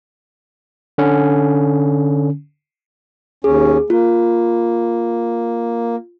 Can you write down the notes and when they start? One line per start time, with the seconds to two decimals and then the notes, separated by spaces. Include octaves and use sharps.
0.98 D3 C#4
3.44 D#2 C#4 G#4
3.90 A#3 F4